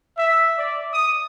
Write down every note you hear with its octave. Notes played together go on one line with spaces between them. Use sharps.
E5
D5
D#6